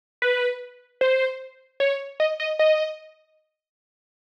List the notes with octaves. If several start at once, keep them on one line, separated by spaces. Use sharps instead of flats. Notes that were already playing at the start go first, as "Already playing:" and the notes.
B4
C5
C#5
D#5
D#5
D#5